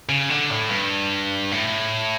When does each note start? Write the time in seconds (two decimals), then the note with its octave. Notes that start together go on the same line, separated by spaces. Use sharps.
0.09 C#3
0.30 D3
0.50 A2
0.70 G2
1.52 A2